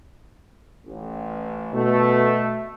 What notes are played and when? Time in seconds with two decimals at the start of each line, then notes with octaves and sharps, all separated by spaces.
0.86 A1
1.73 B2 A3